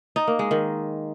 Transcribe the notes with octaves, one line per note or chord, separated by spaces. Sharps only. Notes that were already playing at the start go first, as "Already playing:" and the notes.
D#4
A#3
G#3
D#3